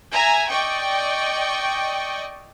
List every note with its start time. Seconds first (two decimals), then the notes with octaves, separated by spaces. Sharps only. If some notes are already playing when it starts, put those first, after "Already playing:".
0.13 E5 G#5 A#5
0.49 D5 D#5 G5 C#6